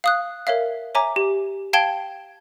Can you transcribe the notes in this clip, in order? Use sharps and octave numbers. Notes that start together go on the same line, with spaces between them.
F5 D#6 F#6
A#4 C#5 E5 F5
C#5 E5 G#5 A#5 D6
G4
F5 G5 A5 G#6 D7 G7